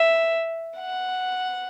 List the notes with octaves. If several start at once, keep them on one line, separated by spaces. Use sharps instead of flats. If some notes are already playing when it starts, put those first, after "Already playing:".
Already playing: E5
F#5